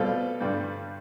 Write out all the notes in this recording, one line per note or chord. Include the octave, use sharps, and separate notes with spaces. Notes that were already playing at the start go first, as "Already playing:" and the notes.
Already playing: B2 G3 C4 F4 A4
G2 D3 G3 D4